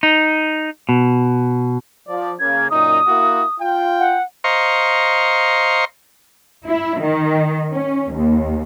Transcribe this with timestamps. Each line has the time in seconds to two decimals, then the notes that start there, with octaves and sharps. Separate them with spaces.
0.03 D#4
0.89 B2
2.07 F3 D5
2.40 C#3 A#3 G#6
2.70 F#2 A#2 D#4 D#6
3.06 A#3 E4 F#4
3.60 F4 G5
3.99 F#5
4.44 C5 D#5 F5 A#5 C6 C#6
6.67 E4
7.00 D#3
7.71 C#4
8.11 D#2